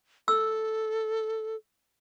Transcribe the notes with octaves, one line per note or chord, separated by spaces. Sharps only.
A4 E6